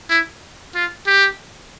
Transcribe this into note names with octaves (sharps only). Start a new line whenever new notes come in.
E4
F4
G4